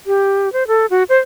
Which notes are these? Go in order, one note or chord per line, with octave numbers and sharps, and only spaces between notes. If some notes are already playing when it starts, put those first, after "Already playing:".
G4
C5
A4
F#4
C5